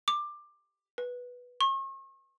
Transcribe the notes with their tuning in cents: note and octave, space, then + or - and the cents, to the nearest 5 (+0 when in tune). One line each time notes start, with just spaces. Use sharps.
D6 +15
B4 -5
C#6 -40